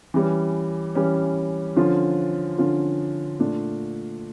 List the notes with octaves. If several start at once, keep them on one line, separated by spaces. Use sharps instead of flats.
E3 G3 C#4
E3 G3 C#4
D3 F3 C#4 F4
D3 F3 C#4 F4
A#2 A3 D4 F4